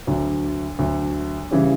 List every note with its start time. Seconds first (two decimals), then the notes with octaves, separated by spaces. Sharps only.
0.07 D2 D3 F#3
0.79 D2 D3 F#3
1.51 C#3 E3 G3 C#4